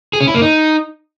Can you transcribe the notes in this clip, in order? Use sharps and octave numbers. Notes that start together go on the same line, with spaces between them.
G#4
C#4
E4
A#3
D#4